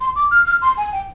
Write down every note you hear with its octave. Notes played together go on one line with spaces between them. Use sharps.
C6
D6
F6
F6
C6
G#5
G5